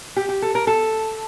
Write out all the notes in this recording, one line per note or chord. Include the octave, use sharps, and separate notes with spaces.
G4
G4
A4
A#4
A4